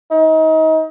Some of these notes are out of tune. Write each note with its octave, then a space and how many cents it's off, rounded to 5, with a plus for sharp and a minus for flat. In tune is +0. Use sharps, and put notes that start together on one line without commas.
D#4 +30